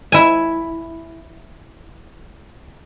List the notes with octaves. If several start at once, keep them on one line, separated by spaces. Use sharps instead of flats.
E4 G#5